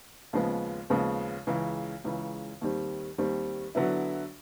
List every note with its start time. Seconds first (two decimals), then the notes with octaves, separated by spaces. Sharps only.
0.33 D#2 C#3 F3 G#3 B3
0.90 D#2 C#3 F3 G#3 B3
1.47 C#2 C#3 E3
2.04 C#2 C#3 E3
2.61 D#2 D#3 G3 C4
3.18 D#2 D#3 G3 C4
3.75 D3 F#3 B3 E4